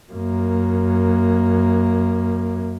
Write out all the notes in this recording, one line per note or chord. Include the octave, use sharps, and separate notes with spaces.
F#2 A#3